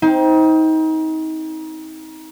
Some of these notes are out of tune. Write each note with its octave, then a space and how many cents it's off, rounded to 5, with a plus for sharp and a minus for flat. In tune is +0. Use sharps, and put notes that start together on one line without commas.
C4 +0 D#4 +30